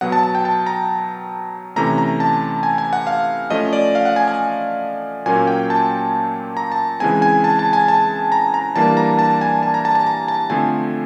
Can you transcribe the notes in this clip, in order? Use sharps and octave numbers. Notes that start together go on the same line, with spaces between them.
B2 F#3 B3 F#5
A5
A5
G5
A5
A#5
C3 E3 A3 C#4 A#5
A#5
A5
G#5
G#5
F#5
F5
F3 A3 C#4 D#5
D5
F5
F#5
G#5
G#5
A#2 F#3 A#3 C#4 G#5
G5
A5
A#5
A5
C#3 E3 G#3 C4 G#5
G#5
A5
A5
G#5
A5
A#5
A#5
E3 G3 A#3 D4 A5
A#5
A5
G#5
A5
A#5
A5
A5
A#5
A5
D3 F3 A3 C4 G#5